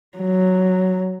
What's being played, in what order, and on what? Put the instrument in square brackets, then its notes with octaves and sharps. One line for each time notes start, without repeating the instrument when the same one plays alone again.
[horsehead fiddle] F#3